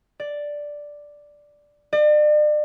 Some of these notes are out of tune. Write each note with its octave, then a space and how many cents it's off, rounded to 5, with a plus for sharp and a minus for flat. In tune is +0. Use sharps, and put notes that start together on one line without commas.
D5 +0
D5 +40